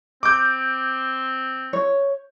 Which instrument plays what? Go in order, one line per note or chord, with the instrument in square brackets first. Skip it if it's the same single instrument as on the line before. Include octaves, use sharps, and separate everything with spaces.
[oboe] C4 [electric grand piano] D6 G6
[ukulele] C#5